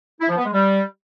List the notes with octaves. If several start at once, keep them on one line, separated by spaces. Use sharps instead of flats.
E4
F3
B3
G#3
G3